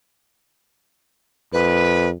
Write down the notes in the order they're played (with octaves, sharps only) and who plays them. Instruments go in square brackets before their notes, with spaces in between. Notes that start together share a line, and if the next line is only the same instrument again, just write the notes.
[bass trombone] F2 [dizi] B4